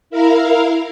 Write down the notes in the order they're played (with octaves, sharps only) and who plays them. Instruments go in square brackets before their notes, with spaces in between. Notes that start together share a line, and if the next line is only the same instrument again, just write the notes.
[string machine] E4 A#4 F5